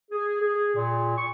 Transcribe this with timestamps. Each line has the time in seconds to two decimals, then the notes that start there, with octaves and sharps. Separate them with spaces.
0.11 G#4
0.41 G#4
0.76 A#2
1.16 C#6